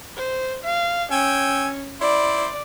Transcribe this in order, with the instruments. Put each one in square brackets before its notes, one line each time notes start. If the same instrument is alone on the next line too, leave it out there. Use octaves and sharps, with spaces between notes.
[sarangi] C5
F5
[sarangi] C#4 [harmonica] G5 G#5 E6
[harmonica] E4 C5 [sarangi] D5